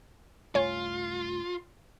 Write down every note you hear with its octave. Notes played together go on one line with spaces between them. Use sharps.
C2 F#2 A3 F4 C#5 G#5